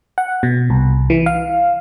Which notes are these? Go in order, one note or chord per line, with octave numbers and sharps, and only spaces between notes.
F#5
B2
C2
E3
F5